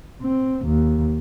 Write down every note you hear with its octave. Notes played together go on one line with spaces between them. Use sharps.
C4
D#2